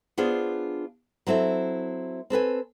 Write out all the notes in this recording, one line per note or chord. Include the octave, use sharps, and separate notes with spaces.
B3 D4 F4 G#4 C5
F#3 C4 E4 A4 C5
C4 A4 B4 G#5